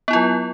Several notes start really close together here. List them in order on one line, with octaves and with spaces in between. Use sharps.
B3 E4 F4 F#3